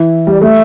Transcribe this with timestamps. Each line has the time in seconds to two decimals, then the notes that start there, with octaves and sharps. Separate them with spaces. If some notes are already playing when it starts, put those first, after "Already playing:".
Already playing: E3 E5
0.27 G3 D5
0.41 A3 E5